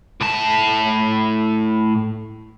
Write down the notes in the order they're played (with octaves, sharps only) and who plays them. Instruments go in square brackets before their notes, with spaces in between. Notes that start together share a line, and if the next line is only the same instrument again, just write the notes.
[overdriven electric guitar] A2 A5